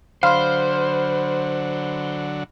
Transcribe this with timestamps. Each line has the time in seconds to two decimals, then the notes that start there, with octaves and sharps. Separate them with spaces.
0.23 D3 F#3 C5 F5 B5 C6 F6